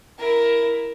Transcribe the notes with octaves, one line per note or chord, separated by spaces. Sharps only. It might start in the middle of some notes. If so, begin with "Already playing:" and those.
E4 A#4